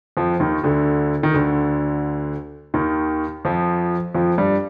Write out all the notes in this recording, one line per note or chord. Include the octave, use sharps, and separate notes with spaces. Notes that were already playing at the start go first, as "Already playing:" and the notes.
F2 F3
D#2 D#3
D2 D3
D#3
D2 D3
D#2 D#3
F2 F3
F2 F3
G2 G3